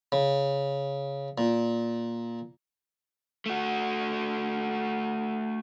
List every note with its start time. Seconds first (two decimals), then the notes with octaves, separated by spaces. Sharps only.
0.12 C#3
1.38 A#2
3.46 A3 F#4